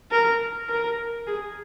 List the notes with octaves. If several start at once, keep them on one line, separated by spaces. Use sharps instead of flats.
A#4
A#4
G#4